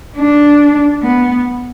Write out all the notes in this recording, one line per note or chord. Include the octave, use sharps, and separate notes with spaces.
D4
B3